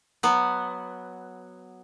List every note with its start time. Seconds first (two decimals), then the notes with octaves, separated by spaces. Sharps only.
0.23 F#3 B3